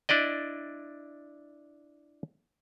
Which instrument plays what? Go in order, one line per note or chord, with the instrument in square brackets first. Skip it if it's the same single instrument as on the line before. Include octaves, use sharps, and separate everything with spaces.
[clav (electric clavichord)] D4 E4 D5 D#5